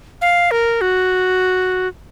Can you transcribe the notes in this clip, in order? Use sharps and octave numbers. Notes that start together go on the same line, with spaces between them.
F5
A#4
F#4